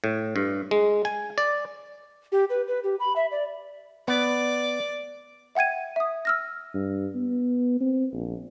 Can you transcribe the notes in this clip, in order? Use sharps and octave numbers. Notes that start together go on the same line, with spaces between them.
A2
G2
G#3
G#5
D5
G4
B4
B4
G4
B5
E5
D5
B3 D5
E5 F#5 G5 G#6 D#7
E5 D#6
E6 F6 A#6
G2
B3
C4
A#1